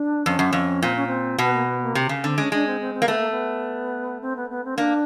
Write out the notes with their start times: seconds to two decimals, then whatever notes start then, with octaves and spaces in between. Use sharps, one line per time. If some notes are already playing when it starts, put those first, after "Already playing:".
Already playing: D4
0.26 F2 C#4
0.39 F#2
0.53 F2
0.82 A#2 C4
0.95 C#4
1.06 C4
1.38 B2 B3
1.53 A#3
1.67 B3
1.81 A#3
1.95 C3
2.09 C#3
2.23 D3 C4
2.37 G#3 C#4
2.52 G#3 D4
2.66 C4
2.80 C4
2.94 C4
3.02 A#3
3.06 A3 B3
3.18 A#3
3.30 B3
4.21 C4
4.36 B3
4.49 B3
4.64 C4
4.77 A#3 D4